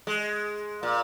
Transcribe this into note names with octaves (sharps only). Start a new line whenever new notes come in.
G#3
A#2